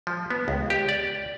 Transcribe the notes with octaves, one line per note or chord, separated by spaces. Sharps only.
F3
B3
C#2
G4
D5